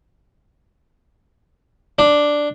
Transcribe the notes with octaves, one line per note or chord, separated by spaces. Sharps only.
D4